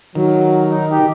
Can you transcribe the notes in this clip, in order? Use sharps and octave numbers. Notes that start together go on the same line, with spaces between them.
D#3 F#3
D#4
D#4 G4